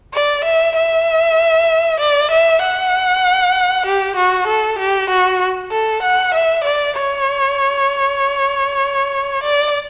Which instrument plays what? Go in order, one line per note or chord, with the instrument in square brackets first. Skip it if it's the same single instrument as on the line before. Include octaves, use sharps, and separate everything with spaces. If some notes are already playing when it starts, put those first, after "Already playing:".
[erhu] D5
E5
E5
D5
E5
F#5
G4
F#4
A4
G4
F#4
A4
F#5
E5
D5
C#5
D5